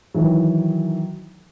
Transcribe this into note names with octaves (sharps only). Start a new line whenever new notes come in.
D#3 E3 F#3